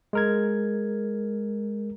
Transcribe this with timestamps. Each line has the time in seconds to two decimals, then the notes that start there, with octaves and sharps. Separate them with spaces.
0.13 G#3 A#4 G#6